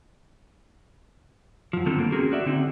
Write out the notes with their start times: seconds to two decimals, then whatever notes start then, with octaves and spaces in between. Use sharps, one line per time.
1.73 F#2 F3
1.86 D3 D#3 G3 C4 F4 A4
1.99 A#3
2.12 C4 C#4 F#4 G#4 A#4
2.32 F#4 D5 E5
2.46 D3 C4 D#4